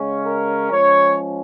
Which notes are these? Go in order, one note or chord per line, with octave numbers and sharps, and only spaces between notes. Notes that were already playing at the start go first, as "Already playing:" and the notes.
Already playing: C#3 G#3 C#4
A#4
F3 G#3 C#4 C#5